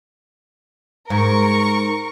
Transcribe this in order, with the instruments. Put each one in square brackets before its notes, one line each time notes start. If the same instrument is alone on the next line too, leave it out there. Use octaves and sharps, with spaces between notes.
[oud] G#2 [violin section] A#4 C#6